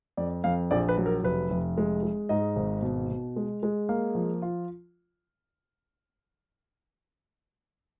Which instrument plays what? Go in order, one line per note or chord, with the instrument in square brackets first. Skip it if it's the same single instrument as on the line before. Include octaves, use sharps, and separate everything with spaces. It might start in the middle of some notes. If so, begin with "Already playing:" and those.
[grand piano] F2 D5
F2 F5
A#1 D5
B4
F#3
A#4
F1 B4
F1
G#3
G#3
G#2 D#5
G#1
B2
B2
G#3
G#3
A#3 F5
F3
F4